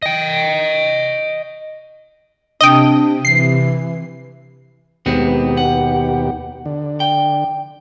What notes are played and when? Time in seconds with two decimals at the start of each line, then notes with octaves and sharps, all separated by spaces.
0.02 D#5 G5
2.61 C3 D4 D#5 G5
3.25 E3 C7
5.06 D#2 B2 G#3 B3 C4 G4
5.57 F#5
6.66 D3
7.00 G5